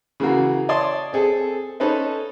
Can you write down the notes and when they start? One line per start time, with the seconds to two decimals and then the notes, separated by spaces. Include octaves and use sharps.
0.20 C#3 E3 A#3 F#4
0.69 C#5 D5 A5 C6 D#6
1.13 C4 G#4 A4
1.80 C#4 D#4 A4 B4 C5